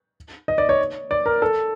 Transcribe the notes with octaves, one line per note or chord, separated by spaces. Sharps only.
D#5
D5
C#5
D5
A#4
A4